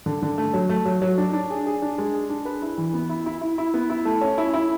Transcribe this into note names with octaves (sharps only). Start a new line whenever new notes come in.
D3
D3
A3
F#3
A3
F#3
F#3
D4
D4
G#4
G#4
D4
G#3
G#4
D4
B4
E4
E3
B3
E4
E4
E4
E4
B3
E4
A3
C#4
E4
E4